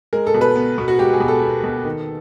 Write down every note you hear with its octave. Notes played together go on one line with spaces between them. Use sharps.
G#3 A#4
A4
B2
B4
B3
B2
F#4
G#3 G4
G#4
B2
A4
B3
B2
D#3